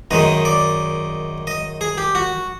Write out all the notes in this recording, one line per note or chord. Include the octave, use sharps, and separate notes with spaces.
F#2 D#3 G#3 D#5
D5
D#5
G#4
G4
F#4